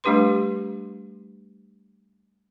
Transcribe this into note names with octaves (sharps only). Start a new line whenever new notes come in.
G3 A3 D4 G4 B4 C6